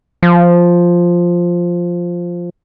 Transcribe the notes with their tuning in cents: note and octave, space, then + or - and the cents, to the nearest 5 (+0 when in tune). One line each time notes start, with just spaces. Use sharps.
F3 +0